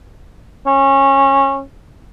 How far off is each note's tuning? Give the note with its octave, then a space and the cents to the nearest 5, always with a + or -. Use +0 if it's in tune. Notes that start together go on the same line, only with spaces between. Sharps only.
C#4 -20